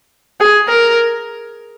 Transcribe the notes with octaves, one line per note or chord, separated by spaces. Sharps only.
G#4
A#4